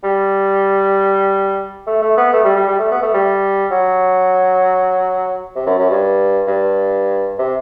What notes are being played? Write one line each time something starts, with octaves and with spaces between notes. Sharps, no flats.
G3
A3
A3
B3
A3
G3
G3
G3
A3
B3
A3
G3
F#3
C3
F#2
F#2
G2
G2
C3